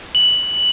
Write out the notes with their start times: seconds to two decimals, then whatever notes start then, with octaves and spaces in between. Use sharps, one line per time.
0.15 F#7